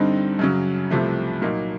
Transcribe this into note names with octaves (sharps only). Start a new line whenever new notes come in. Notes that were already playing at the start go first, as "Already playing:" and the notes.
Already playing: G2 D3 G3 C4 D#4
F#2 C#3 F#3
C2 C3 F3 A3
A#2 F#3 A#3 D#4